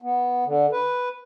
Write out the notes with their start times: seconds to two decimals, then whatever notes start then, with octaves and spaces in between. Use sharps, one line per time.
0.02 B3
0.47 D3
0.72 B4